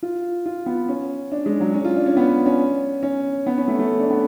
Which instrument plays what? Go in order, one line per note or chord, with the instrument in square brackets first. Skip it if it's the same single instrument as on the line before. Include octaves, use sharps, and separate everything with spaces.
[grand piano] F4
F4
B3
C#4
D4
G#3
F#3
C#4
F4
D4
C#4
B3
C#4
C#4
B3
C#4
A3
A3
D4
B3